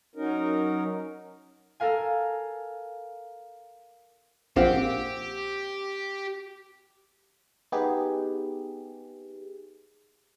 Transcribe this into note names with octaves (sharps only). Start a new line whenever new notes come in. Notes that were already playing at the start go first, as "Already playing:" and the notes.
F#3 C#4 D#4 A#4
A4 A#4 F5 G#5
A#1 C4 G4 F5 F#5
B3 D#4 G4 G#4